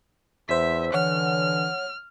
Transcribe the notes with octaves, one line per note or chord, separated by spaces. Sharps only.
E2 C5 E5 E6 B6
D3 E3 C#5 F#5 F6